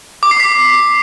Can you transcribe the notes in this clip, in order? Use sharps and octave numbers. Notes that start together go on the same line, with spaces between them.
D6
C7
B6